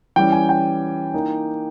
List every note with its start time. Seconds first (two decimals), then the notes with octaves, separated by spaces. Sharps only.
0.16 E3 G3 C#4 G5
0.32 G#5
0.49 G5
1.14 E3 A#3 D#4